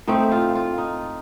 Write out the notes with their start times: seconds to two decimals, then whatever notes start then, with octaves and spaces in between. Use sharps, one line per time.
0.07 A2 A3 C4 D#4
0.32 F4
0.55 F4
0.78 D#4